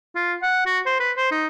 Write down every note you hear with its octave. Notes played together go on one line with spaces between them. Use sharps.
F4
F#5
F#4
C5
B4
C5
D#4